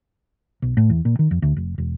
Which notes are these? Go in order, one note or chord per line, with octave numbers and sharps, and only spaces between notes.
B1
A2
E2
A#2
D#3
F2
D2
F1
E1